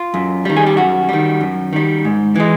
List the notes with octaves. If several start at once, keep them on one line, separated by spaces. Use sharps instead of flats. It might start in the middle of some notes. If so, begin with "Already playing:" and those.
Already playing: F4
F#2
D#3 G3
G#4
G4
F#2 F#4
D#3 G3
F#2
D#3 G3
G#2
E3 G#3